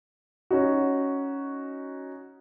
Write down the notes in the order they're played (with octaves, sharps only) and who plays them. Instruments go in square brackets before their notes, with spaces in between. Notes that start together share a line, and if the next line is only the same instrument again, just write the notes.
[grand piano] C#4 D#4 F#4